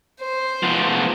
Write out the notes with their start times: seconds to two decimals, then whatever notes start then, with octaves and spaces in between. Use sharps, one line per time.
0.20 C5
0.63 F3 B3